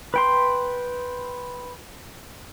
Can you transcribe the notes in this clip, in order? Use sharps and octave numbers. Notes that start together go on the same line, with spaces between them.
B4 G5 C6